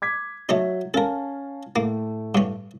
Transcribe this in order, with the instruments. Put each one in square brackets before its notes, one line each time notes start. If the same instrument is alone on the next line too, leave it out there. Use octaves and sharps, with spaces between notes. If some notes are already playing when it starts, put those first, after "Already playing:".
[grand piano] D6 G#6 B6
[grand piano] F#3 C#5 E5 [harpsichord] A3 C#4 D#4
[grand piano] C#4 F5 A5 [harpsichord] A4 A#4
[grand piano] A2 A3 [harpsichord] A#3
[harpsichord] G2 C#4